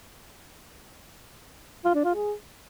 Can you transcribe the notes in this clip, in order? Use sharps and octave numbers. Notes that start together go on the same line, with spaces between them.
F4
D4
F4
G#4